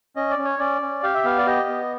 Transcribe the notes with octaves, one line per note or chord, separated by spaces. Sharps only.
C#4 D#5
D5
C#4
C#5
C#4 D5
C#4
G4 F5
E5
B3 F5
D5
G4 D#5
B3